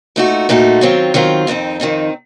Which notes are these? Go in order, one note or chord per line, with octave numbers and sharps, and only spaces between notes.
A#2 A3 D#4 F#4
A#2 A3 D#4 F#4
D#3 F#3 C4 F4
D#3 F#3 C4 F4
F2 D#3 A3 C4 D#4
F2 D#3 A3 C4 D#4